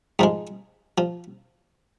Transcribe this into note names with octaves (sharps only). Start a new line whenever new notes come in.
G#2 F3 G#3
F3